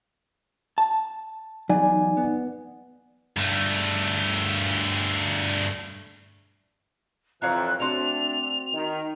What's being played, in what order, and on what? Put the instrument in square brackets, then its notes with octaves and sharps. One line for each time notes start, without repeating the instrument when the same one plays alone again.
[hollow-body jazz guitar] A5
[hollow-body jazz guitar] E2 F#3 [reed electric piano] D#4 D5 G#5
[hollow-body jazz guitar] B3
[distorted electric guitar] G2 A3
[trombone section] F2 E3 [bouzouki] C#5 F5 A#5 [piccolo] F#6
[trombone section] A3 D4 [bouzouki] C4 F#4 [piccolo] F7
[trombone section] D#3